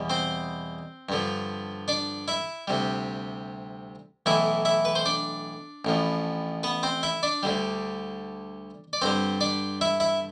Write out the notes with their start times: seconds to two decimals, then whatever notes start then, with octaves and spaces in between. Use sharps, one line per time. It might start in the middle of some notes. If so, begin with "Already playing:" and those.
Already playing: E2 B2 G3
0.10 C4 C5
1.09 G2 D3 F3
1.88 D4 D5
2.28 E4 E5
2.68 D2 C3 G3
4.26 B1 A2 E3 E4 E5
4.65 E4 E5
4.85 B4
4.95 C5
5.06 D4 D5
5.85 A1 A2 F3
6.63 B3 B4
6.83 C4 C5
7.03 E4 E5
7.23 D4 D5
7.43 D2 D3 G3
8.93 D5
9.02 G2 D3 G3 C4 C5
9.41 D4 D5
9.81 E4 E5
10.00 E4 E5